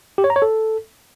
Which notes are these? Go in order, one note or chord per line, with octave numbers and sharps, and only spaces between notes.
G4
C#5
A#5
C#5
A4